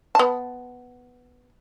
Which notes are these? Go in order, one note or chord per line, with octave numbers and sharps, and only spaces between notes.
B3 A5